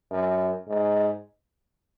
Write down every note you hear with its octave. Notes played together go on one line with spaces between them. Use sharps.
F#2
G#2